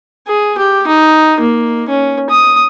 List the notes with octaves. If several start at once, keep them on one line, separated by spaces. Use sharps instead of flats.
G#4
G4
D#4
A#3
C#4
D#6